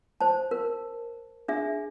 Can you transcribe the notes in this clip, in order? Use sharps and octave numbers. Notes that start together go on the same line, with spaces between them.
C5 A5
A#4
D4 G#4 E5